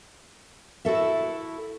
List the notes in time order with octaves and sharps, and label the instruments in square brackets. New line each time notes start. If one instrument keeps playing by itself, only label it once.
[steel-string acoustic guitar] E4 F#4 A4 E5